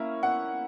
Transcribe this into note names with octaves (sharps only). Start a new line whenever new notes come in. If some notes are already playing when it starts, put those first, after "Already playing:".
Already playing: A#3 C#4 E4
F#5